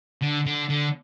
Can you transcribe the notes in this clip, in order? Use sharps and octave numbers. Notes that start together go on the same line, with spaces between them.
D3
D3
D3